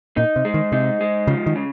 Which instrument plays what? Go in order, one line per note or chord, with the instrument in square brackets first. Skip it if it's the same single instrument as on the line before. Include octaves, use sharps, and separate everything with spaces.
[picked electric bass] A#2 [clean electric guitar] D#4
[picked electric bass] C3
[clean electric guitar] G#3
[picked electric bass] D#3
[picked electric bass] C3 [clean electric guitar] D#4
[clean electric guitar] G#3
[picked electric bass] C#3 [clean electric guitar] F3
[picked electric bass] D#3
[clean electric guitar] C#3